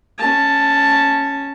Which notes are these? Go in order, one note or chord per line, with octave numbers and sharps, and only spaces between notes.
C#4 A5